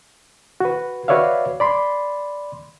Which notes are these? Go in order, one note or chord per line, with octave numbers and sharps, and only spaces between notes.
F#4 B4
F#4 B4 C#5 D5 E5 F5
D5 B5 C6